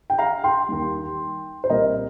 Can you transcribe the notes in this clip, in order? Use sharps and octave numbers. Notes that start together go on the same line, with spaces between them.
G5
F5 A#5
G5 C6
D#2 D#3 G3
C5
C2 A#2 G3 A#4 D#5